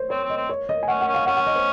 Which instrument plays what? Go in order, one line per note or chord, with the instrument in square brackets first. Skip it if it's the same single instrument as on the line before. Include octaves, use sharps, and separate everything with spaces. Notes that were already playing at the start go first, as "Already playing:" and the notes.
Already playing: [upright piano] C5 C#5
[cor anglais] C4 [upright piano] C#5
[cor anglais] C4
[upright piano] D#5
[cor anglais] C4
[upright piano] C#5
D#5
G#5
[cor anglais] C#4 [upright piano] F#5
[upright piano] F#5
[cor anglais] C#4
[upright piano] F5
[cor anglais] C#4 [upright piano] F#5
[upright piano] F#5
D#5
C5